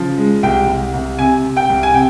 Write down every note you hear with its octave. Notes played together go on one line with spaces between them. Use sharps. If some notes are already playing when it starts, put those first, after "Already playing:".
Already playing: C#3 F3
G#3
C2 G5
C2
C2
C3 G#5
C3
G5
C2
G#5
C3 G5